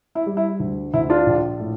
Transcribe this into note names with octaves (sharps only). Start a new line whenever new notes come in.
E4
G3
E4
D2
D2 E4
D4 F4
A#1
A2